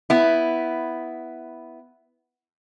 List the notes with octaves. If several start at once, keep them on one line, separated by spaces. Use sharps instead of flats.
B3 E4